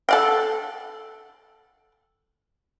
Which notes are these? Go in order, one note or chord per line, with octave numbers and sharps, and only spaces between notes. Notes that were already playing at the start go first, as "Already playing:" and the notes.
A4 F#5 G5